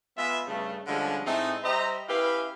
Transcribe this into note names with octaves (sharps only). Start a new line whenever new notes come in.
G#3 B3 F4 E5
G2 C#3 A3
D3 F3 G3 G#3 C#4
A2 G#3 A3 C4 D#4
G3 C5 D#5 E5 A#5
C#4 E4 G4 B4 E5 F5